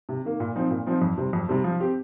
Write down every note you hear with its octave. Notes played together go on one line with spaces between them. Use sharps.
C3
D#3 A#3
A#2
F3 C4 D#4
A#2
F3 C4 D#4
F2
C3 G3 C4
F2
C3 G3 C4
F3
C4 G4